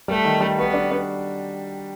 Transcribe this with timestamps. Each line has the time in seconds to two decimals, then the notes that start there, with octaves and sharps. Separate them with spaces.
0.08 G3 A3
0.25 D#3
0.41 G3
0.58 B3 F#4
0.74 D4
0.91 D4